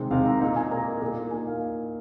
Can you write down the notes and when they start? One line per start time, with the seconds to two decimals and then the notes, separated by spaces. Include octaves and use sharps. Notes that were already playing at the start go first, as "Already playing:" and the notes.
Already playing: C3 D#3 G#3 C4
0.11 C3 D#3 G#3 C4 F5
0.26 A#5
0.40 A#2 A#3 D#4 F5
0.56 G#5
0.71 A#2 A#3 D#4 A#5
1.02 A#2 A#3 D#4
1.31 A#2 A#3 D#4 G#5
1.47 F5